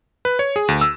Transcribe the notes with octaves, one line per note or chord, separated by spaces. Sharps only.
B4
C#5
G#4
D2
E6